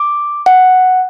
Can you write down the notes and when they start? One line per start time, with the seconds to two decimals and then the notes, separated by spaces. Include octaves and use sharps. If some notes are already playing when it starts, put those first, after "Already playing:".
Already playing: D6
0.46 F#5